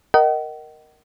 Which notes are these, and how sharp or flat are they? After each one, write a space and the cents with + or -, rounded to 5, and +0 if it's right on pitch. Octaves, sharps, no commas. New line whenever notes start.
A#4 +0 D#5 +0 F#5 +45